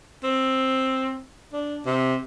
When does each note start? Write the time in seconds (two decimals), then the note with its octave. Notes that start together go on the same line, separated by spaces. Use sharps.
0.24 C4
1.53 D4
1.86 C3